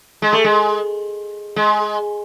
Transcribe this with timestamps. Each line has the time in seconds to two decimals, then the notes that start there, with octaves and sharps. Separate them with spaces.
0.22 G#3
0.33 A3
0.44 G#3
1.56 G#3